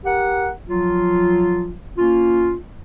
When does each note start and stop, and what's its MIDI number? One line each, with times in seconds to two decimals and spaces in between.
0.05 0.49 67
0.05 0.49 70
0.05 0.49 78
0.68 1.72 53
0.68 1.72 54
0.68 1.72 65
1.97 2.54 58
1.97 2.54 61
1.97 2.54 65